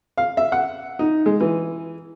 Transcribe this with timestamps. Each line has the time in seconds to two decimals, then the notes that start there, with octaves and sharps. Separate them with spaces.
0.18 F5
0.37 E5
0.52 F#5
0.99 D#4
1.26 G#3
1.41 E3